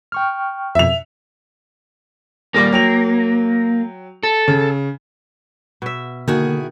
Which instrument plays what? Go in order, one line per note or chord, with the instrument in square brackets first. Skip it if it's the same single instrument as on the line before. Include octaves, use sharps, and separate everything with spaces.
[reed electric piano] G5 C#6 F6
[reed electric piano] F2 B2 [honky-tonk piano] E5 F7
[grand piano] D#1 G3 D6 [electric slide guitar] A#3
[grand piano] F#3 G5 F7
[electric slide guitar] A4
[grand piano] C#3
[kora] B2 E5
[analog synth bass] D3 [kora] D#3 [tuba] A#3 [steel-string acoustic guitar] E4 F#4 G#4